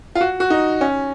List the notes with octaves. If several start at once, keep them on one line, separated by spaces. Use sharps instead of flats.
F4
F#4
F#4
D#4
C#4